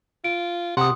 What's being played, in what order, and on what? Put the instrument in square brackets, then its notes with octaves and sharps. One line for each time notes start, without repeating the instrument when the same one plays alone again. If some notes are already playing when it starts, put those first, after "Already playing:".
[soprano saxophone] F4 [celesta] D7
[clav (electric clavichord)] C3 [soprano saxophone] F#5 [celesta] C6 D#6